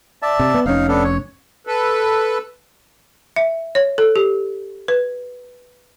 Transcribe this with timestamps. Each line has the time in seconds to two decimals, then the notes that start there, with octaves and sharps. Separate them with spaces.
0.22 D5 E5 A5
0.39 C3
0.54 B3
0.66 F1 C#4 D#4 F5
0.88 B3 D4 A4
1.04 C#5
1.67 A4 B4
3.36 E5
3.75 C#5
3.98 A4
4.16 G4
4.88 B4